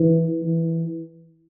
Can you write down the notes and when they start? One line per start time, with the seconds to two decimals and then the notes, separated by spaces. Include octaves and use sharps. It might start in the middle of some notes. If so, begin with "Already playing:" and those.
Already playing: E3
0.43 E3